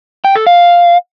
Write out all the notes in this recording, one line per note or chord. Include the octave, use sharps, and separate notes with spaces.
G5
A4
F5